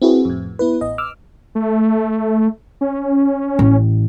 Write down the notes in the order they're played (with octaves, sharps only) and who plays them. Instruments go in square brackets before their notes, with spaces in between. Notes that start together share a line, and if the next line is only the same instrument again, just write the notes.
[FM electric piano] C4 E4 F#4 G#4 B4
F2 A2
B3 E4 B4
A1 D#5
D6 E6 F6
[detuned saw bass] A3
C#4
[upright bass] A1